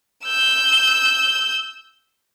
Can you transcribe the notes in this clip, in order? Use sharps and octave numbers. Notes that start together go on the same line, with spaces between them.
E6 G6